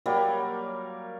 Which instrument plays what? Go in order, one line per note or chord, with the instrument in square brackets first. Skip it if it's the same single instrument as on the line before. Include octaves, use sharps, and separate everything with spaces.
[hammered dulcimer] F#3 G3 A#3